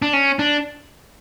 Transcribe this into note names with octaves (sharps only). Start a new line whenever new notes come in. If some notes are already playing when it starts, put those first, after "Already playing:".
D4
C#4
D4